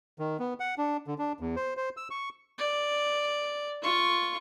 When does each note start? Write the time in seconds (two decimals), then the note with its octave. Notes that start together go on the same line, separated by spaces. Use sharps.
0.19 D#3
0.39 B3
0.60 F#5
0.78 D4
1.07 D3
1.18 D4
1.40 E2
1.56 C5
1.77 C5
1.97 E6
2.11 C#6
2.58 D5
3.82 F4 C#6